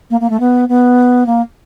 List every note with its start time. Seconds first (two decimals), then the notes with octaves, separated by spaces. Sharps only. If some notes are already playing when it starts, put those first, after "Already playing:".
0.10 A#3
0.21 A#3
0.30 A3
0.40 B3
0.69 B3
1.26 A#3